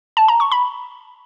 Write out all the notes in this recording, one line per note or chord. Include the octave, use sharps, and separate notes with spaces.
A5
A#5
C#6
B5